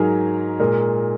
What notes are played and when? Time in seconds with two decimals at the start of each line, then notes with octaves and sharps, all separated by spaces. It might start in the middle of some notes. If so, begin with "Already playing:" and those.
Already playing: G#2 F#3 G#4 A#4
0.60 A#2 G#3 A#4